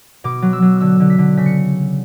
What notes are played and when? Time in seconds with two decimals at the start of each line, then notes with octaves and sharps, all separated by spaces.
0.24 B2 D6
0.42 F#3
0.53 E6
0.62 F#3
0.80 D3 E6
1.00 D3
1.10 B6
1.18 D3
1.37 C#3 B6
1.46 C#7